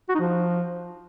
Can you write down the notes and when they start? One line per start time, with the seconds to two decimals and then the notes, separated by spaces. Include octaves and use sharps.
0.10 F#4
0.15 D#4
0.20 F3